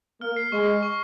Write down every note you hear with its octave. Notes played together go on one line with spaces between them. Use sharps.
A#3 F6
C7
G#3 C#6
C7
C#6